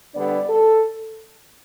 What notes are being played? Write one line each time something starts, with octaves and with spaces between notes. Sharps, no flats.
D3 G3 B3 D4 D5
A4